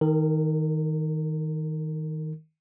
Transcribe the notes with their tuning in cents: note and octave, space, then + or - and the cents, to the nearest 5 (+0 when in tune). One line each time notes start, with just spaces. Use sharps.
D#3 +15 A#4 -30